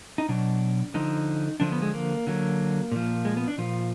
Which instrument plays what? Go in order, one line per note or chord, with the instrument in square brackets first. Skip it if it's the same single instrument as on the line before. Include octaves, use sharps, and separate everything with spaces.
[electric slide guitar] D#4
B2 F#3 D4
D3 F3 D#4
D3 F3 D4
B3
G#3
A#3
D3 F#3
A#2 F3
G#3
B3
D4
A#2 F3 F4